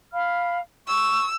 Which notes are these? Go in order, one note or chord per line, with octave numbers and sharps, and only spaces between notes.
F5 B5 F6
C#6 E6